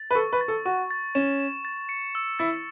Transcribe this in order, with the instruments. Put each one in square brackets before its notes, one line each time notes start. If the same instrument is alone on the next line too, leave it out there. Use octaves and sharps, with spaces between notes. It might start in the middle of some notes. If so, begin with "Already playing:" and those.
Already playing: [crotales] A6
[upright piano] B4
[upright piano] A4 [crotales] C#6
[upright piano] B4
[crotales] A6
[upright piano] A4
[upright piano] F#4 [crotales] C#6
[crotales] A6
[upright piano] C#4 [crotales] E7
[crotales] E7
A6
C#7
E6
[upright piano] E4 [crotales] A6